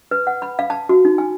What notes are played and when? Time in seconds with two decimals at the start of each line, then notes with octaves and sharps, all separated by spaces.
0.11 B4
0.27 F#5
0.42 B5
0.59 F5
0.70 A5
0.89 F#4
1.05 D#4
1.18 G#5